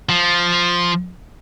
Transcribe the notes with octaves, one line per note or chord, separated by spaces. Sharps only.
F3